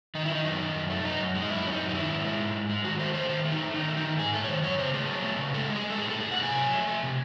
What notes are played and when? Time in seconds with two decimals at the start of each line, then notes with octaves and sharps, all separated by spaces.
0.15 D#3 D#4
0.25 E4
0.30 D#3
0.35 D#4
0.45 F#2
0.60 D#3
0.75 F#2
0.90 A3
1.04 F#2 D#4
1.19 F#2
1.34 G#3
1.42 D#4
1.50 F#2 E4
1.64 F#2 C#4
1.72 D#4
1.79 F#2
1.89 D#4
1.94 D#3 E4
2.09 G#2
2.25 G#3
2.39 G#2
2.54 G#2
2.69 G#3
2.84 D#3 F#4
2.99 A3 C5
3.14 A3 C5
3.29 D#3 C5
3.44 A3
3.52 D#4
3.58 A3
3.74 D#3 D#4
3.88 A3
3.97 D#4
4.04 D#3
4.19 G#2 G#4
4.34 A3 A4
4.44 C#5
4.48 D#3 C5
4.63 F#2 C#5
4.78 C#3 C5
4.94 A3 G#4
5.08 F#3
5.24 A3
5.39 C#3
5.53 G#3 A4
5.68 G#3
5.76 G#4
5.84 G#3
5.90 A4
5.98 A2 G#4
6.09 A4
6.13 A2
6.21 G#4
6.28 A2 F#5
6.43 C3 G#5
6.58 F#3
6.73 A3
6.88 A3
7.03 C3